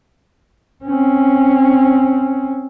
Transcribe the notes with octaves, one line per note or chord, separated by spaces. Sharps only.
C4 C#4